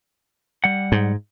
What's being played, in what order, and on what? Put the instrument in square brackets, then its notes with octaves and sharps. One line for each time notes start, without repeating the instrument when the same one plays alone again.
[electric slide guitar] G3 F#5
[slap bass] G#2